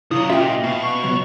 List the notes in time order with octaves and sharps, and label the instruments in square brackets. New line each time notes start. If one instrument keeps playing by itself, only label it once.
[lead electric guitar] C#3 F#3 [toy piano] E4 [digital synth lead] D#6
[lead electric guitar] A#2 [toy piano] C#4 F#4 [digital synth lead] F4 [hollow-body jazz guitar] E5 G5
[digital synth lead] D#5
[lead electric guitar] B2 [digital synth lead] F5
[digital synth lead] C#6
[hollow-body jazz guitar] C#2 F#3